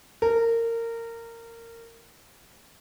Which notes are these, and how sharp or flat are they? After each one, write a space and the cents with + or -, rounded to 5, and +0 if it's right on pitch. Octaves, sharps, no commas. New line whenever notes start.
A#4 -20